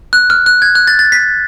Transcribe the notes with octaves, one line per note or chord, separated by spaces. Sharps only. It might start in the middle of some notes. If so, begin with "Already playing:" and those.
F#6
F6
F#6
G#6
F#6
A6
A6
B6